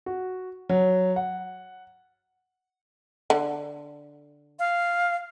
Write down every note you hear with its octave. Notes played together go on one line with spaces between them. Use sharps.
F#4
F#3
F#5
D3
F5